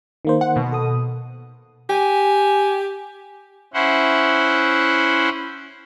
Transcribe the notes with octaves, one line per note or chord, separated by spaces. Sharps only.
D#3 A#3 C5
F#5
B2
A4 D#6
G4 G#5
C#4 E4 C5 F#5